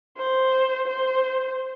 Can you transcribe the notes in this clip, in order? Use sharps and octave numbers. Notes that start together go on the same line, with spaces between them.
C5
C5